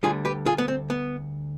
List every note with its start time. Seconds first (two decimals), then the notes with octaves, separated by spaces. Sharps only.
0.03 D2 D3 G3 F4 G#4
0.25 G4 B4
0.46 F4 G#4
0.58 B3
0.68 C4
0.90 B3